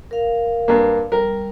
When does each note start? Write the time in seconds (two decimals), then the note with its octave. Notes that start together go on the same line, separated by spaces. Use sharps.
0.11 A#4 F5
0.68 G2 A#3
1.12 G3 A#4